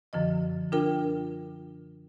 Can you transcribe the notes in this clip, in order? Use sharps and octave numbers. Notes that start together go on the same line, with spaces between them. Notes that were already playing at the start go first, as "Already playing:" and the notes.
F#2 D3 F3 D#5
D4 F4 A#4 G5